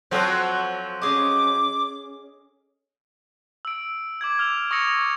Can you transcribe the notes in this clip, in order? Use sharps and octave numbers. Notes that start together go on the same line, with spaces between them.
F3 F#3 C4 F#4 A4 C5
C#4 G#4 D#5 D6
E6 D7
D6 E6 G#6
F6 F7
C#6 D#6 E6 A#6 C#7 F7